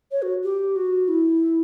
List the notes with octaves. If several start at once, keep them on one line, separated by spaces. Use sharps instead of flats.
C#5
F#4
G4
F#4
E4